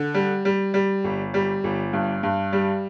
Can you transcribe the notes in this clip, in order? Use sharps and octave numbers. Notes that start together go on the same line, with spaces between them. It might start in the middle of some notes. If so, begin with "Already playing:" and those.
Already playing: D3
G3
G3
G3
G1
G3
G1
G2
G2
G3